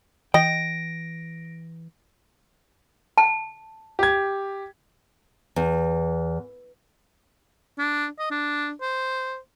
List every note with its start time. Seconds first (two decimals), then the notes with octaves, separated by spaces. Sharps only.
0.34 E3 D#5 G5 A#6 D7
3.18 A5
3.99 G4 G#6
5.56 E2
7.79 D4
8.19 D#5
8.31 D4
8.81 C5